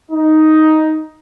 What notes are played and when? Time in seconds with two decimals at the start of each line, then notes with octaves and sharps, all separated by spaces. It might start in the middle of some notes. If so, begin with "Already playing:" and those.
0.11 D#4